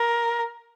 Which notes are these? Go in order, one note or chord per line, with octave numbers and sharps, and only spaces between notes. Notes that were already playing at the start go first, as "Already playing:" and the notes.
Already playing: A#4